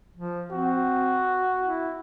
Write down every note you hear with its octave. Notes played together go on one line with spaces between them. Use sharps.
F3
C4 F#4
E4